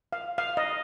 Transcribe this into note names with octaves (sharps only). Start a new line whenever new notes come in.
F5
F5
D#5